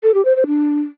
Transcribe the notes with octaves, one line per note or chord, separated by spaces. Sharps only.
A4
G4
C5
C5
D4